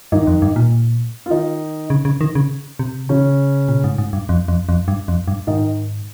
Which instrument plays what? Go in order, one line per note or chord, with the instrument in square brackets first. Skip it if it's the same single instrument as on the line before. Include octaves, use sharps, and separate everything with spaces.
[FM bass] G2 [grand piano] D#3 D#4
[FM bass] F2
G2
A#2
[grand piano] F4
D#3 D#4
[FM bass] C#3
C#3
D#3
C#3
C3
[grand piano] C#3 C#4
[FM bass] A#2
G#2
G#2
G2
F2
F2
F2
G2
F2
G2
[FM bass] G#2 [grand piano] D#3 D#4